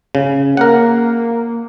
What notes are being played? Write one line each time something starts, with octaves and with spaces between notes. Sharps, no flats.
C#3
A#3 A#4 F#5